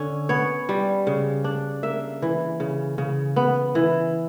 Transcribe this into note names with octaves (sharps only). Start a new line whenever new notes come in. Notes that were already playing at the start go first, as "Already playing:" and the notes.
Already playing: D3 C#4
B3 C#5
G3
C#3
D4
A#3 E5
E3
C#3
C#3
B3
E3